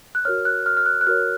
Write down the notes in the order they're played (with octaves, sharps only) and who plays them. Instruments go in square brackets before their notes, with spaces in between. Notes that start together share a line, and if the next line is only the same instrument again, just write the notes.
[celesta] F#6
F#4 A#4 C#5 F6
F#6
F6
F6
F#6
F#6
F#4 A#4 C#5 F6